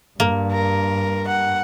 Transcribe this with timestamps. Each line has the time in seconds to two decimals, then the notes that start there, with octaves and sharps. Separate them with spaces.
0.20 G2 A#3
0.52 A#4
1.28 F#5